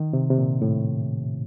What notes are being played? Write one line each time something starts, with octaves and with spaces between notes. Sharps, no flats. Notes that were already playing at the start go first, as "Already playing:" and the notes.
Already playing: D#3
C3
C3
A#2
A2